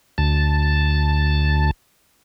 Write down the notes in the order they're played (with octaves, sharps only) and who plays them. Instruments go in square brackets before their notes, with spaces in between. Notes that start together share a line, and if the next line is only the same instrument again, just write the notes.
[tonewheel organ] D2 A5